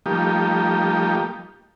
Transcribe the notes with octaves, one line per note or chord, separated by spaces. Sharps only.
F3 G3 A3 A#3 D#4 G4